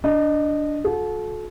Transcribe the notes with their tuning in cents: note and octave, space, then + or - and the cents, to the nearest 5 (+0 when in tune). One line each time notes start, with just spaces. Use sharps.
D4 -5 D#5 -15
F#4 -35 A4 -30